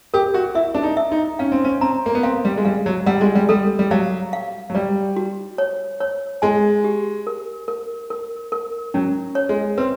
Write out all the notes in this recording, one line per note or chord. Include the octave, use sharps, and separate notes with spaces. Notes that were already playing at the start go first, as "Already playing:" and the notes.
G4 A#4
F#4
E4 E5
D4
D#4
E5
D#4
C#4 F5
C4
C#4
C4 A#5
A#3
B3
C4 F5
G3
G#3
G3 F5
F#3
G3 F#5
G#3
G3
G3 A4
G3
F#3 F5
F5
F#3
G3 D5
F#4
C#5
C#5
G#3 G#5
G4
A#4
A#4
A#4
A#4
F#3 C#4
C#5
G#3
C4 B4